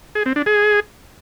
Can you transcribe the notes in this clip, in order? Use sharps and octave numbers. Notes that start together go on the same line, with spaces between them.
G#4
C4
D4
G#4